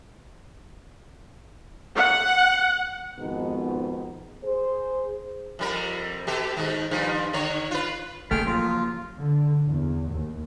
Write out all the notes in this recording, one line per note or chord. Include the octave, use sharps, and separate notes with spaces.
F#5
F2 G#2 B2 D#3 B3 D#4
G#4 C5
F2 G3 A#4
B2 G4 A4
G#2 D#3 D#4
G2 D#3 F3
D3 D#3 C#5
F4 B4
C#3 A3 A#3 G#4 G5 F6
F3 F#3 F4
D3
E2
D#2